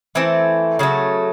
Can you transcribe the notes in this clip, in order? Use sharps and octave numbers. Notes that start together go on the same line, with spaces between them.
E3 A3 C4
C#3 F#3 A3